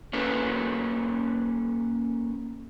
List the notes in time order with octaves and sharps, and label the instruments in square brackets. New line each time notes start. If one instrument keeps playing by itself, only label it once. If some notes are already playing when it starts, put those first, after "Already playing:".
[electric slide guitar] A#3 C#4 A4 B4